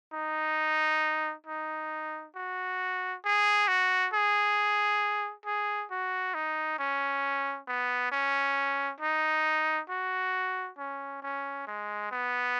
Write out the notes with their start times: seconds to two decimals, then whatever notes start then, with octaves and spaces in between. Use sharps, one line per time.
0.13 D#4
1.47 D#4
2.36 F#4
3.25 G#4
3.68 F#4
4.13 G#4
5.46 G#4
5.91 F#4
6.34 D#4
6.79 C#4
7.68 B3
8.12 C#4
9.01 D#4
9.90 F#4
10.78 C#4
11.22 C#4
11.67 G#3
12.11 B3